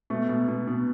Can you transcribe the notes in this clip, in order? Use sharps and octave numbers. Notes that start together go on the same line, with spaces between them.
B2 A3
B2
B2
B2